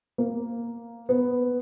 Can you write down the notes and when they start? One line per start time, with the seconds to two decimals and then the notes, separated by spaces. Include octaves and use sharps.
0.18 A#3
1.09 B3